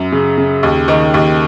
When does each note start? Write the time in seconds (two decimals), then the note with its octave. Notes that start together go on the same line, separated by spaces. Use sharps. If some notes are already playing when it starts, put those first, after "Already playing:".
Already playing: F#2
0.12 C#3
0.38 C#3
0.63 D#2
0.88 D#3
1.14 D#2